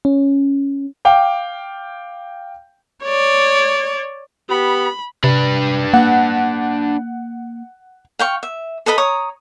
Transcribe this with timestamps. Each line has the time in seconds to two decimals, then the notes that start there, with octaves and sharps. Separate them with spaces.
0.05 C#4
1.05 F5 G5 D6
3.03 C#5 D5
4.49 B3 G4 B5
5.24 C3 D4 B4
5.94 A#3 F#5
8.19 F5 G5 C#6
8.43 E5
8.86 A4 B4 D#5 B5
8.98 C#5 A#5 D#6